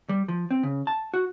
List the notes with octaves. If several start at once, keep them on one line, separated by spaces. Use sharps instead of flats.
G3
F3
C4
C#3
A5
F#4